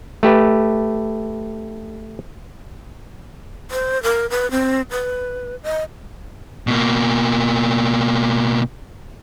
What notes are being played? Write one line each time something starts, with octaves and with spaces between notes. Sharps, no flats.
A3 G4 B4
C5
A#4
B4
C4
B4
D#5
B2 A#3